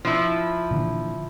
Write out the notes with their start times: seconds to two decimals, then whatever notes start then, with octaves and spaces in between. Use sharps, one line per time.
0.05 F3 E4
0.71 A#2 D3 E3